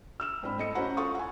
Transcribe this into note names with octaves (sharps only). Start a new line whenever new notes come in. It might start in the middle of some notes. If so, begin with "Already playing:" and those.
E6 F6 E7
G#2 C4 D4 C5 B5
A3 D#5 C#7
C#4 F#4 C5 F#5 A#5 B5
F4 A4 F5 C#6 D#6
F#5 G#5